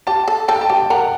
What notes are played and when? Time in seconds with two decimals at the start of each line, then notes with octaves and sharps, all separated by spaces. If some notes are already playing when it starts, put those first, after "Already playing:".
0.07 G4 A5
0.28 A4
0.48 A4 G5
0.61 A5
0.70 G4 G5
0.90 A#4 F#5